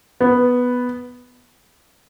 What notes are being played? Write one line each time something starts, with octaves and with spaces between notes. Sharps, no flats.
B3